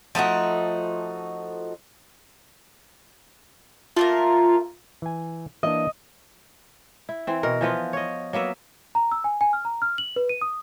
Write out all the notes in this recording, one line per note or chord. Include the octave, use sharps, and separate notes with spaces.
F3 A3 D#4 F#4
A3 A#3 F4 A#4
E3 G#5
E3 A#3 D4 D#5
E4
E3 C4
B2 A#4
E3 F3 B3 F4
C#5 D#5
F#3 A#3 B3 E5
A#5
E6
G#5
G#5
F6
A#5
F6
F#7
B4
D#7
D#6